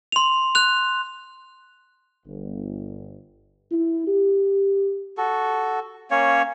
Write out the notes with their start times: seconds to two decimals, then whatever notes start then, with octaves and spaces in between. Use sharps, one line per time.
0.12 C6 F7
0.55 F#6 F7
2.26 G1
3.71 E4
4.07 G4
5.17 F#4 A4
6.11 A#3 C#4 C#5